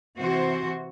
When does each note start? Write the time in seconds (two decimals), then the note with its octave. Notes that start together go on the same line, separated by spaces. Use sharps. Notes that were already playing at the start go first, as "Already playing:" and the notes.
0.16 C3 E3 F#4 C5